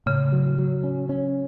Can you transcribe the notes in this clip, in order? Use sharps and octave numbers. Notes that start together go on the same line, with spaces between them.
A2 C#3
F#3
F#3
C#4
C#4